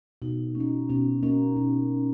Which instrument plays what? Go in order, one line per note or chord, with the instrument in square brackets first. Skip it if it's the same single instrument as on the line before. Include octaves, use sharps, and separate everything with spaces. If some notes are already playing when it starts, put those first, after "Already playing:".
[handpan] B2 [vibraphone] D#4
[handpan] A#3 [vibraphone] C#4
[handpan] D#4
[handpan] B2 [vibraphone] C#4
[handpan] A#3 D#4 [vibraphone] C#4
[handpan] B2